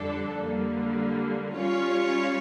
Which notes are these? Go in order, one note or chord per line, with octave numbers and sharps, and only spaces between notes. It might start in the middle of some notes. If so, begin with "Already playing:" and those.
Already playing: F2 D3 G3 D4 A4
D3 G3 A#3
G3 C#4 F4 C#5